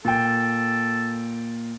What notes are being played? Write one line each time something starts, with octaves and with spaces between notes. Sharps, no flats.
A#2 A4 G5